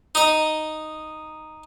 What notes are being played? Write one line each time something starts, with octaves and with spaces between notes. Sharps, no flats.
D#4 D#5